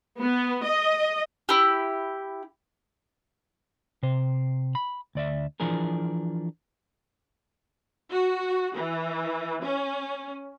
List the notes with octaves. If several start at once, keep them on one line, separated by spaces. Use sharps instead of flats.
B3
D#5
E4 G4
C3 C5
B5
D2 D5 E5
E3 F3 D4 G#4 A#4
F#4
E3
C#4